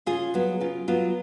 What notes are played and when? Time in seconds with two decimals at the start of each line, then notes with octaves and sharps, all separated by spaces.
0.06 C#3 F4 G#4
0.34 F#3 B3
0.61 C#3 F4
0.88 F#3 B3 F4